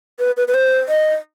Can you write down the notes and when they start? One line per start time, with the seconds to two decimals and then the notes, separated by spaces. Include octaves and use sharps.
0.19 B4
0.37 B4
0.48 B4
0.54 C5
0.89 D#5